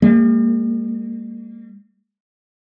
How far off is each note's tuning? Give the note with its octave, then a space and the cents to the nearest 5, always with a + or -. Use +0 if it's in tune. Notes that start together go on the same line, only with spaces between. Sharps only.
G3 +45 A#3 -25